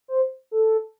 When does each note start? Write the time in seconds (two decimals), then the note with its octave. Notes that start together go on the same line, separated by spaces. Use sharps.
0.08 C5
0.51 A4